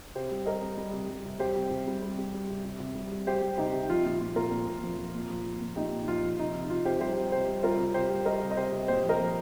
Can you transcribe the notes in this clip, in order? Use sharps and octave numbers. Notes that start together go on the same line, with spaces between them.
C3 G4 C5
G3
G3 A#4 D#5
G3
G3
C3
G3
C3
G3 G4 C5
C3
C3
G3
G3
G3
G3
C3
C3
C3
G3
G3
G3 G4 C5
G3
C3 D#4 G4
C3
F3 F4
A#2 F4
A#2 F4
A#2 F4 A#4
A#2
A#2
F3
F3
A#2
F3
A#2
A#2
A#2 D#4 G4
A#2
F3 F4
F3
C3 D#4
C3
C3 F4
C3 G4 C5
G3 G4 C5
G3
C3 G4 C5
G3
G3 F4 A#4
C3
C3 G4 C5
G3
G3 A#4 D#5
C3
D#5
C3 G4 C5
C3
A#2 G4 C5
F3
A#4 D#5
F3